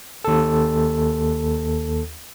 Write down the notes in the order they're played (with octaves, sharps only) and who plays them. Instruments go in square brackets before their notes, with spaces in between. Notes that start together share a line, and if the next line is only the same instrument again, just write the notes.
[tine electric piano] D#2 A4